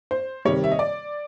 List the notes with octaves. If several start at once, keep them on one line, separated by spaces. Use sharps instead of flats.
C5
C3 D#3 G3 C#5
E5
D#5
D5